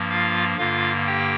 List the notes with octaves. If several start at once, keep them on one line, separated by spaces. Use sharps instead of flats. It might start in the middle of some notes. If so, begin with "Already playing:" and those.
Already playing: G2 F3 A#3
F4 F5
G2 D3 A#3 F4 F5
G4 G5